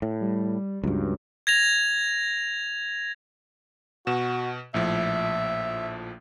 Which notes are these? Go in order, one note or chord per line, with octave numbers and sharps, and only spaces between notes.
A2
G3
C#2 G2 F#3
G#6 A#6 F7
B2 F#4 E7
A#1 A2 F3 E5